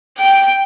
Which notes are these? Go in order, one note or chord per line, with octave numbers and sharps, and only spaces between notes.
G5